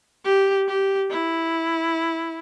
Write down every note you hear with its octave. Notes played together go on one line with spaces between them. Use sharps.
G4
G4
E4